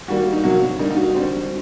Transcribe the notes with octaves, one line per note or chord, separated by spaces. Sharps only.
D#3 G3 A#3 F#4
D#4
C3 F#3 A#3 F#4
D3 G3 A#3 D#4
D#4
F#4
D3 G3 C4